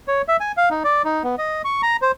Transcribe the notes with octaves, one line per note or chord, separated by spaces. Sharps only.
C#5
E5
G#5
F5
D#4
D5
D#4
B3
D#5
C#6
A#5
C5